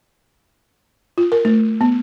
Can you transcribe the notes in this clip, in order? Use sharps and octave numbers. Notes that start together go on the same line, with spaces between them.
F4
A#4
A3
B3